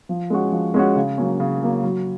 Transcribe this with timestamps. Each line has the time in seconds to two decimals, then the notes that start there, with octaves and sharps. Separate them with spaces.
0.09 F3
0.30 G#3 C#4 F#4
0.52 F3
0.74 G#3 C#4 F#4
0.96 C#3
1.18 F#3 A#3 C#4
1.40 C#3
1.61 F#3 A#3 C#4
1.84 F#3